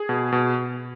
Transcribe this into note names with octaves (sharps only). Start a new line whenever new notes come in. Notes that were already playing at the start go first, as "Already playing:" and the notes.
Already playing: G#4
B2
B2